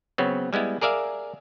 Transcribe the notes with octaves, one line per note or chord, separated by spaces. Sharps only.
C#3 F#3 B3 C4
G3 G#3 B3 E4
G#4 A#4 D5 E5 F5